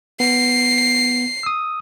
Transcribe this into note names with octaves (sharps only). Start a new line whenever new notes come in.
B3 C7
D#6 E6